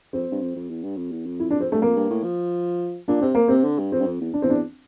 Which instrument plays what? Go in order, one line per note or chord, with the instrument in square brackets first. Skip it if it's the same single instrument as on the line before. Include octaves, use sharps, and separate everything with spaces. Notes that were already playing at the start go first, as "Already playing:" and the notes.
[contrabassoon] F2 [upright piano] C4
[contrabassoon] G2
F2
F2
E2
G2
F2
E2
F2
[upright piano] E4
D4
C4
[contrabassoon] G2 [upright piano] A3
[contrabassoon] F2 [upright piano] A#3
[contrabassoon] G2
A2
F3
[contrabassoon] A#2 [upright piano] D4
[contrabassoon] C3 [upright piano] C4
[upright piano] A#3
[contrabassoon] C3 [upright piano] C4
[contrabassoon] D3
G2
[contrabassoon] F2 [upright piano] C4
[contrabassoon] G2
F2
E2
[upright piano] D4
[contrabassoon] E2 [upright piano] C4
[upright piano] D4